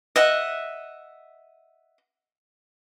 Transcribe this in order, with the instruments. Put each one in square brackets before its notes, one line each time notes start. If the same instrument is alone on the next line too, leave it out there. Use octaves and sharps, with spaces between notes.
[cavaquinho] D#5 E5 F#5